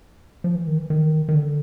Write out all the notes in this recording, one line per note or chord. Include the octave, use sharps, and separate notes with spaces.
F3
E3
D#3
E3
D#3
D#3
D3